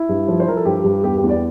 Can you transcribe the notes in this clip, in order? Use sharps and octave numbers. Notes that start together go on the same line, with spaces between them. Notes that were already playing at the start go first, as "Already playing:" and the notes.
Already playing: E4
G2
F3
C5
F3 A#4
A4
G2 G4
G2
E2 G4
G4
E2
D5